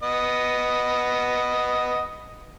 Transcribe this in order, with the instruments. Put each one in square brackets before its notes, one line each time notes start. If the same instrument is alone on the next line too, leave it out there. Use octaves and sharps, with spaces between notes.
[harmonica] B3 D#5